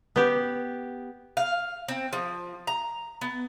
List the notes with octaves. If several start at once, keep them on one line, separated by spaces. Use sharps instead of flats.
B3 G4
F5
C4
F3
A#5
B3